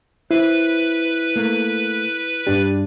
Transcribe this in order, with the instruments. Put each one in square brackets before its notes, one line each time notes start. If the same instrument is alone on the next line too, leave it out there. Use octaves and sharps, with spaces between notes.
[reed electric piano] E4 [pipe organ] B4 [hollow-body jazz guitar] C5
[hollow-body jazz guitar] A3 A#3
[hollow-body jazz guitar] G2 D4 [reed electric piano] G4